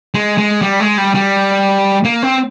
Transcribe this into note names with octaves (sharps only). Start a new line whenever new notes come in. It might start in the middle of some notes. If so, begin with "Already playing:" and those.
G#3
G#3
G3
G#3
G3
G3
A#3
C4